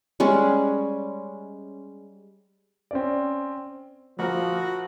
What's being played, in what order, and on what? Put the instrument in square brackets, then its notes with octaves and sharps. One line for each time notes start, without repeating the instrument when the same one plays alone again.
[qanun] G3 G#3 C#4
[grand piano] C4 C#4 D5
[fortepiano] A#1 A#4 [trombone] F3 [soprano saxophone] F#4